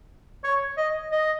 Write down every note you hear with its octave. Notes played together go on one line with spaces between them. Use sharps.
C#5
D#5
D#5